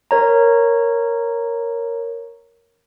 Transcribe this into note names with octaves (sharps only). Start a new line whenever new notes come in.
A#4 C#5 A#5